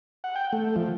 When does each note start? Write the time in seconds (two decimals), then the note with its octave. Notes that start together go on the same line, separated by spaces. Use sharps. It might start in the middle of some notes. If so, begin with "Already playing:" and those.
0.24 F#5
0.36 G5
0.53 A3
0.76 F3